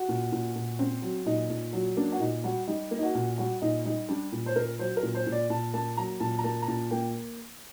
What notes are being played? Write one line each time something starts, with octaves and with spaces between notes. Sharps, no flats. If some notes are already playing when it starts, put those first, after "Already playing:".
Already playing: F#4
A#2
A#2
A#2
C4
F#3
A#2 D#4
A#2
F#3
A#3 D4
F#4
A#2 D#4
G3 F#4
G3 D#4
A#3
D#4
F#4
A#2
G3 F#4
A#2 D#4
G3 D#4
G3 D4
A#2
C5
A#2 A#4
F#3 C5
A#4
A#2
C5
A#2
D5
A#2 A5
A#3 A5
F#3 A#5
A#2 A5
A#5
A#3 A5
A#5
A#2 A5
A#3 G5